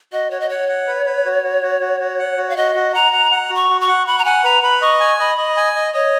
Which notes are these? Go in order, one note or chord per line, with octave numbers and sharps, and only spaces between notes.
F#4 D#5
F#4 C#5
D#5
C#5 F#5
F#5
B4
B4
F#4
F#4
F#4
F#4
F#4
F#5
F#4
F5
F#4 D#5
F#4
F#5 A#5
F#5
F#5
F#4
C#6
F#4
C#6
F#5
F#5 B5
A#5
F#5 G#5
B4 A#5
B4 B5
D#5 C#6
G#5
D#5 B5
D#5
G#5
D#5
C#5 D#5